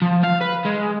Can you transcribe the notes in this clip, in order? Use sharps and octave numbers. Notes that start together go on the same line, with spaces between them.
F3
F5
B4
G#3